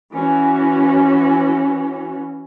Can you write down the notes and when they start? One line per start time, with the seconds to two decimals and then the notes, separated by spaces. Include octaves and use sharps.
0.13 E3 C#4 F#4